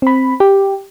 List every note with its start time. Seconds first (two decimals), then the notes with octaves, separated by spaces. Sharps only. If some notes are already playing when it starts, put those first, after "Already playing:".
0.02 C4 B5
0.40 G4